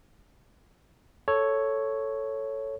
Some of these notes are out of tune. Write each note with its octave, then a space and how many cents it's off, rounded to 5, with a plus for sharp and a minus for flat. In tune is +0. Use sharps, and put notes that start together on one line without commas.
A4 +0 C#5 +0